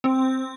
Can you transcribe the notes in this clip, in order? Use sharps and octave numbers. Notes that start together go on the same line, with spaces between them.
C4